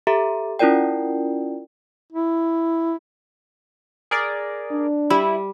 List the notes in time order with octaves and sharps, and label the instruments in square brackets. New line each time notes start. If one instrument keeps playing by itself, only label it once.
[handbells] G4 A4 E5 A#5
C#4 E4 F4 A#4 D5 G5
[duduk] E4
[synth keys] G#4 A#4 D5
[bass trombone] D4
[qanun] G3 [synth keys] E4